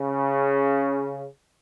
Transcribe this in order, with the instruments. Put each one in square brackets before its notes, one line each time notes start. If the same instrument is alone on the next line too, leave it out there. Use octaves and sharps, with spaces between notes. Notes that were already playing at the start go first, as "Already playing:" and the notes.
Already playing: [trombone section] C#3